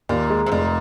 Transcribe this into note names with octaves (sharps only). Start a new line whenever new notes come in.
D#2 A#2
G#3
C3
F1 A#2